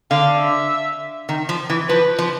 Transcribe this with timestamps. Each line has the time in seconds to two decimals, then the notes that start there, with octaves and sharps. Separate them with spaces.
0.11 D3 F5
0.40 E5
1.29 D#3
1.49 F3
1.70 E3
1.89 F3 B4
2.19 F3